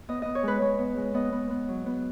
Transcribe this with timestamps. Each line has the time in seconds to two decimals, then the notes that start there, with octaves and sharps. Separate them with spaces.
0.08 B3 D#5
0.22 B3 D#5
0.35 C#5
0.43 G#3 B4
0.61 G#3 C#5
0.78 B3
0.97 G#3
1.14 B3 D#5
1.32 B3
1.50 B3
1.68 F#3
1.86 B3